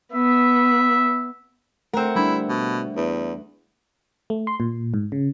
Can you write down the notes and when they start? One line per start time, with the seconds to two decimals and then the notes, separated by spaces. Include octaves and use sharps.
0.13 B3 E5
1.93 A3 C4 A#4 F#5
2.16 G3 D4 E4
2.49 B2
2.96 E2
4.30 A3
4.47 C6
4.60 A#2
4.94 G#2
5.12 C#3